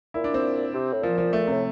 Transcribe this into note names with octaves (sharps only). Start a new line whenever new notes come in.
A#2 E4
D4
C4
C3
A2
A#2 F3
F3
A3
C3
A2